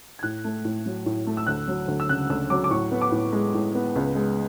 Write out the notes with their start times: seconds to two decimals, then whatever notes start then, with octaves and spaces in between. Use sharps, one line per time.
0.19 G#6
0.23 A2 F#6
0.44 A3
0.65 A2
0.86 F#3
1.06 A2
1.27 A3
1.37 E6
1.47 D2 F#6
1.68 F#3
1.88 D2
2.00 E6
2.09 C#3 F#6
2.30 D2 E6
2.50 F#3 D6
2.64 D6
2.71 A2 C#6
2.92 B3
3.02 D6
3.12 A2
3.33 G#3
3.54 A2
3.75 B3
3.96 C#2
4.15 G#3